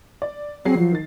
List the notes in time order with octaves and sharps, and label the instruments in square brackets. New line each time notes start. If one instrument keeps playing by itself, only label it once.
[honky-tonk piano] D5
[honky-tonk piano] F#3 G#4 C7 [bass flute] C4
[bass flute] F3 [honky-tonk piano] F#3
[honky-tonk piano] D#3 A6